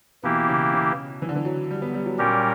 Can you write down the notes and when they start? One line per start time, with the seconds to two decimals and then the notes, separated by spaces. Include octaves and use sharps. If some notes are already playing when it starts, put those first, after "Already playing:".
0.24 B2 E3 A#3 E4 G4
0.48 C#3
0.73 C#3
1.22 E3
1.29 D3
1.36 E3
1.45 F#3
1.71 G3
1.82 B3
1.94 G3
2.06 F#3
2.18 A#2 G3 C#4 G4 A#4